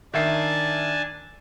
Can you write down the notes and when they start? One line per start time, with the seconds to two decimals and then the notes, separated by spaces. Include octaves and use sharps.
0.14 D#3 D4 E5 G#5 A5 C7